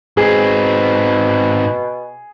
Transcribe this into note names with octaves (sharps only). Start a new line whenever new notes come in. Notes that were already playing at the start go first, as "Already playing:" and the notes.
G#2 B2 C4 G#4